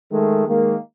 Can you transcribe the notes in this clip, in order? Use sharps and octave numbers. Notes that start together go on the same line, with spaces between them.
D#3 G#3 A3 G#4 A4
D#3 G#3 A#3